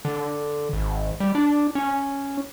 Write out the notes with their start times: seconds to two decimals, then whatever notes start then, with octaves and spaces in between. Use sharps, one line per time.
0.05 D3
0.73 G#1
1.20 G3
1.35 D4
1.75 C#4